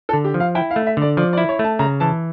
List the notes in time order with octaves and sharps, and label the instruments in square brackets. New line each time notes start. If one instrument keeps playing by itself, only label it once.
[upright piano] A4
[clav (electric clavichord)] D3
[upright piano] G4
[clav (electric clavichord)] F3
[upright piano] F5
[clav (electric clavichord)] E4 [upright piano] G5
[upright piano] F5
[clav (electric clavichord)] A3
[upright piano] E5
[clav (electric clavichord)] D3 [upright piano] D5
[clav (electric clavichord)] F3 [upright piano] D5
[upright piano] D5
[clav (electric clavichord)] E4
[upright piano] C#5
[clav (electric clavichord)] A3 [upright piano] A5
[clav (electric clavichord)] C#3 [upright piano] A#5
[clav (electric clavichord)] E3 [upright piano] A5